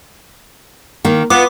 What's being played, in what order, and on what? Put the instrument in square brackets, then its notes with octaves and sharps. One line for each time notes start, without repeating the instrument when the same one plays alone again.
[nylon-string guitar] D#3 A#3
[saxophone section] B3 [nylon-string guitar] F4 [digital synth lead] D6